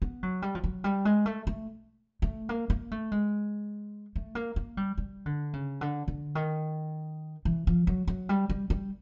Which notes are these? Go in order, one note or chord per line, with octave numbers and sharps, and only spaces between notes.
B3
F#3
G3
F3
F#3
G3
G#3
A3
A3
A3
A#3
A#3
A3
G#3
A3
A#3
A#3
G3
G3
D3
C#3
D3
D3
D#3
E3
F3
F#3
F#3
G3
G3
G3